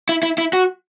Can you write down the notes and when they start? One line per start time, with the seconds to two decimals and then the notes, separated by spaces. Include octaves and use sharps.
0.09 E4
0.23 E4
0.38 E4
0.53 F#4